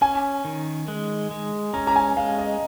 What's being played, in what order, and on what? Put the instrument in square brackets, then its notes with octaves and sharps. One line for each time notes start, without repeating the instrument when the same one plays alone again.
[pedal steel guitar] C#4 [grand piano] G#5
[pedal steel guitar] D#3
G#3
G#3
[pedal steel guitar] C#4 [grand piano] A#5
[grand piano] A#5
G#5
[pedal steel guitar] G#3 [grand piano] F5
[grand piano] D#5